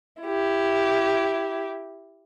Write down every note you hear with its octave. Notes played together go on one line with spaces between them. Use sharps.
E4 G4